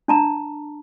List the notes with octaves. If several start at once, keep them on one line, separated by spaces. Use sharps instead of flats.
D4 A5 A#5